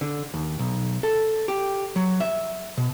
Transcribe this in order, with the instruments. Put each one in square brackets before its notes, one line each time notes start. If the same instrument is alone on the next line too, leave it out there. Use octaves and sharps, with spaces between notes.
[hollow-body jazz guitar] D3
D#2
B1
A4
G4
F#3
E5
B2